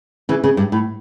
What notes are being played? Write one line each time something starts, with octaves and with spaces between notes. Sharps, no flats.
C#3 E3
C#3
G2
A2